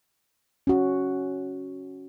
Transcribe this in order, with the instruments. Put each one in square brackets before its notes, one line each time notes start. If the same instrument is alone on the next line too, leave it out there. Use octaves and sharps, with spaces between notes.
[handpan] C#4 F#4